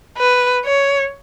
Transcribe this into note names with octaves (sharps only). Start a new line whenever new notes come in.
B4
C#5